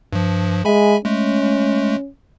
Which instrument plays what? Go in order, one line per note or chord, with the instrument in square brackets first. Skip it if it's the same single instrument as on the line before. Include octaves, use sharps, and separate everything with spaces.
[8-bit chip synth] G2 F3
[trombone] G#3 [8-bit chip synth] E5 G#5 B5
[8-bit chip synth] G#3 A3 [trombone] C#4